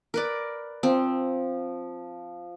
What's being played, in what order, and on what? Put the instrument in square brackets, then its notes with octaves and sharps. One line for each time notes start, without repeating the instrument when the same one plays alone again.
[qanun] A#4 B4 D5
[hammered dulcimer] F3 [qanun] C4